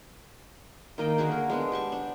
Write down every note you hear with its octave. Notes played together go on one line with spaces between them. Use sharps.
D#3 A#3 D#5 G5
D3 A#3 F#4 G#4
A#4
G#3 B3 D4
G4 A5 C#6
D4